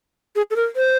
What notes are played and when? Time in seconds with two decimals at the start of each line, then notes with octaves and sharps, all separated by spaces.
0.36 G#4
0.51 A4
0.56 A#4
0.76 C5